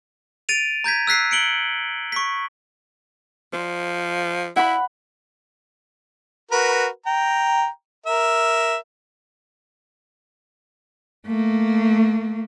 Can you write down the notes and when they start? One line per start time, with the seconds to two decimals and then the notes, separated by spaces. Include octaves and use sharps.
0.49 A6 D7 D#7 F7
0.84 A#5 G6 G#6 B6
1.07 E6 F#6 B6 C7
1.31 C#7 D7 F#7 G7
2.12 C#6 B6
3.53 F3 C5
4.56 E4 F#5 B5
6.51 F#4 A#4 B4
7.06 G5 A#5
8.06 A#4 E5
11.26 A3 A#3